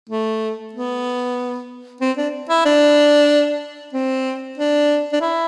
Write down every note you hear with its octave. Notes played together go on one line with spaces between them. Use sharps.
A3
B3
C4
D4
E4
D4
C4
D4
D4
E4